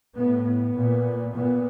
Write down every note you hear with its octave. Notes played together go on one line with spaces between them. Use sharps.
A2 B3
B3
A#2
A#2 B3